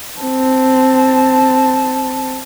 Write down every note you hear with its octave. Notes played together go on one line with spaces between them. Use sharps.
C4 A5